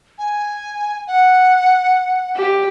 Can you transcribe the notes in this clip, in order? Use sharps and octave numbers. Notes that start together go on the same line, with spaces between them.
G#5
F#5
G4